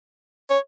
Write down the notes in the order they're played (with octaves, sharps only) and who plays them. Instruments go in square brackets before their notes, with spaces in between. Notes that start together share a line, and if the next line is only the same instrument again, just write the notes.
[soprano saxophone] C#5